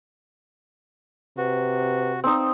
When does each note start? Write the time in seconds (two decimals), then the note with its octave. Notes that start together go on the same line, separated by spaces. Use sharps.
1.37 C3 F#4 B4
2.24 C4 D#4